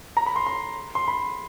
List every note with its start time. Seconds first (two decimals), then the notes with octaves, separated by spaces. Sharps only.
0.17 A#5
0.26 B5
0.36 C6
0.47 C6
0.95 C6
1.08 B5